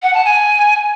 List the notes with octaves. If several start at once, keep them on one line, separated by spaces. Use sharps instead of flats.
F#5
A5
G#5